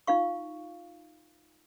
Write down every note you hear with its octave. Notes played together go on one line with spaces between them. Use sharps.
D#4 F4 F5 C#6